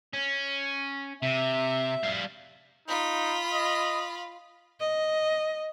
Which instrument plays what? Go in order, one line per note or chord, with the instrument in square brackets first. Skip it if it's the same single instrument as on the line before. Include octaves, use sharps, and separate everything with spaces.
[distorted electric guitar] C#4
[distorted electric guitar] C3 [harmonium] E5
[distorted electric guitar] G3 F5
[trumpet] D#4 [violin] F4 B5
[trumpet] D#5
[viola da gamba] D#5